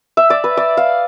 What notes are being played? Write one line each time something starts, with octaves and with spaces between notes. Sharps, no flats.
E5
D5
B4
D5
F5